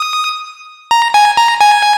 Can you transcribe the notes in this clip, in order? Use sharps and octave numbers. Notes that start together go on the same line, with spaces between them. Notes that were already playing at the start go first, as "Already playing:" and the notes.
Already playing: D#6
A#5
G#5
A#5
G#5